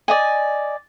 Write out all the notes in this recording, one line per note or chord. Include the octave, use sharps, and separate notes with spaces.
D5 D#5 G#5